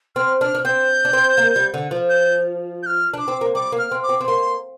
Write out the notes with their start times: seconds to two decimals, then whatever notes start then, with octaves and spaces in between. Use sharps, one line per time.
0.16 C4 F6
0.41 D4 F6
0.55 D4
0.65 C4 G6
1.05 D4
1.13 C4
1.38 A#3
1.56 G3
1.74 D3
1.91 F3
2.10 G6
2.83 G6
2.86 F6
3.14 D4
3.19 D6
3.28 C4
3.41 A#3
3.55 G3 D6
3.72 A#3
3.79 F6
3.92 C4
4.03 D6
4.09 C4
4.21 C4
4.27 A#3 C6